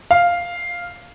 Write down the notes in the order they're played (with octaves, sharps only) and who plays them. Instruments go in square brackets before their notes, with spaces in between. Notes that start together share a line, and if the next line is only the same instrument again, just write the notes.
[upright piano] F5